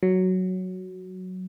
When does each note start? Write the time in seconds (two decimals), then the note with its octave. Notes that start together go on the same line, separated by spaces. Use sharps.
0.03 F#3